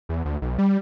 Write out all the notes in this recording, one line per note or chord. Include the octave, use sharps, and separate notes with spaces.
E2
D2
B1
G3